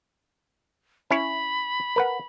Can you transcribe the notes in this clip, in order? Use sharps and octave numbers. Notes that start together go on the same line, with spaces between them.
C#4 E4 C#5 B5
A#4 B4 F#5